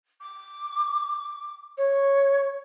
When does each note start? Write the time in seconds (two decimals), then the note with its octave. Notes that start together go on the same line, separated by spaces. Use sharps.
0.20 D6
1.77 C#5